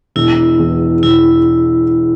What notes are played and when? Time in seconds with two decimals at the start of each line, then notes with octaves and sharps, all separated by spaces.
0.16 E1 E4
0.59 E2
1.03 E1 E4